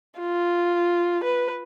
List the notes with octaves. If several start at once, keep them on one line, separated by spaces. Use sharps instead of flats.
F4
B4